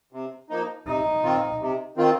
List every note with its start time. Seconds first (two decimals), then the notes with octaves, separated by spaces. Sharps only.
0.13 C3
0.50 F3 A#3 D#4
0.86 C3 D#4
1.23 D#3 C4 F4
1.60 C3
1.97 D#3 C4 F4